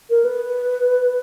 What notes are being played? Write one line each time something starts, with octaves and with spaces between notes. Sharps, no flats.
A#4
B4